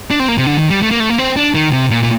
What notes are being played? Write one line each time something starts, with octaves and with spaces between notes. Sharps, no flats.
D4
C4
A#3
C3
D3
D#3
G3
A3
A#3
A3
A#3
C4
D4
D#3
C3
A#2
A#2